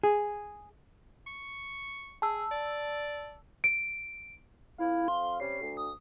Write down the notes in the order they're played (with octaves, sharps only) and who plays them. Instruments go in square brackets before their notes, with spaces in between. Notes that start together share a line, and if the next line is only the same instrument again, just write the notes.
[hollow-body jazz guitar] G#4
[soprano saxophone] C#6
[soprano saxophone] G#4 [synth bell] A5 E6
[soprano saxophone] D5
[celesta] D7
[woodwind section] F2 F5 [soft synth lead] E4
[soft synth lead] C6
[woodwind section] C3 G3 C#4 [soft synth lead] C7
[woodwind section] D2
[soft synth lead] D#6